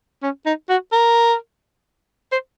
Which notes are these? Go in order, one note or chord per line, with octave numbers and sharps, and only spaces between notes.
C#4
D#4
F#4
A#4
C5